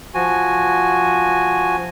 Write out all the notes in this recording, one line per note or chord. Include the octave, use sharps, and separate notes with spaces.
F3 F#4 G#5